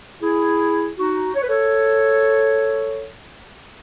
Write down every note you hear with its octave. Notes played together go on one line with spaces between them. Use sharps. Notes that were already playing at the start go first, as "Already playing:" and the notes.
E4 G#4
D#4 F#4
C#5
B4
A4 C#5